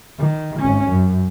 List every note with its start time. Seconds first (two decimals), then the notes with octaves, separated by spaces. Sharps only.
0.19 D#3
0.60 G#1 C#4
0.89 F#2